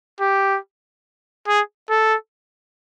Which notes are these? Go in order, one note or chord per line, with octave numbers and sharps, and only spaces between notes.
G4
G#4
A4